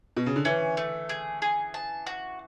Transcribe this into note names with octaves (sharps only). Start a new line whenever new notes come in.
B2
C#3
D3
E3 C#4
A3
G#4
G#4
A5
F#4